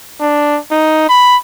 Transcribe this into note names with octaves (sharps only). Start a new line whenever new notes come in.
D4
D#4
B5